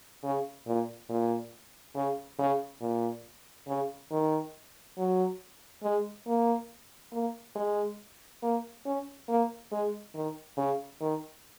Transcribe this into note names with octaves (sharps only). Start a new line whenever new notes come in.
C#3
A#2
A#2
C#3
C#3
A#2
C#3
D#3
F#3
G#3
A#3
A#3
G#3
A#3
C#4
A#3
G#3
D#3
C#3
D#3